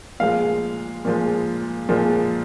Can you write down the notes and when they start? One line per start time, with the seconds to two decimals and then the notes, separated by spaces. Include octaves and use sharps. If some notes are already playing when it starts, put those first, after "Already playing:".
0.20 A#2 F3 G#3 F5
1.05 A#2 F3 G#3
1.89 A#2 F3 G#3